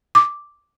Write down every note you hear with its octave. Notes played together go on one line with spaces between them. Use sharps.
D6